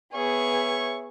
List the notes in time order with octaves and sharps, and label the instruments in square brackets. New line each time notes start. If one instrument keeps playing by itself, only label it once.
[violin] B3 G#4 [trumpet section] C#5 E5 C#6